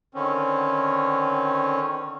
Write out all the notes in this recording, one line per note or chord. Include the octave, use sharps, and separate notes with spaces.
D3 D#3 C4 C#4